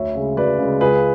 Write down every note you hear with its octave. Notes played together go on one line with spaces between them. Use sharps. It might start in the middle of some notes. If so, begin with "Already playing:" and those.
Already playing: D2 C#5 E5
C#3 G#3
D2 B4 D5
C#3 G#3
C#2 G#4 B4